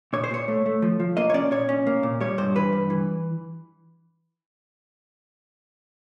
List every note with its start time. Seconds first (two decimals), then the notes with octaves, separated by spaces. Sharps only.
0.13 A#2 C#5
0.24 C5
0.31 A#2 C#5
0.48 A3
0.66 A3
0.82 F3
1.00 F3
1.17 A#3 D#5
1.30 C#5
1.34 C#4 D5
1.51 A#2 C#5
1.69 C#4
1.87 A#3
2.03 A#2
2.20 G3 C#5
2.38 G2 C5
2.55 E3 B4
2.73 G2
2.90 E3